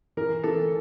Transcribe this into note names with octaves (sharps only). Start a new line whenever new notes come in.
E3 A#4
E3 A4